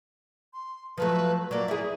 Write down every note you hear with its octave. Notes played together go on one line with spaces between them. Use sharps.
C6
F3 F#3 A3 B4
F#3 A#3 D5
E4 G#4